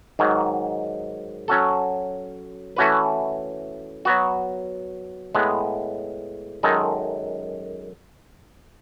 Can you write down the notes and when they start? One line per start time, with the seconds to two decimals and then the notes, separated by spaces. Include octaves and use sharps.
0.19 G#2 D#3 F#3
1.48 F#3 C#4 F#4 A4
2.77 E3 A3 C#4 F#4 B4
4.05 F#3 B3 F#4
5.35 A2 G#3 B3
6.63 F#2 D#3 G#3 D#4 A4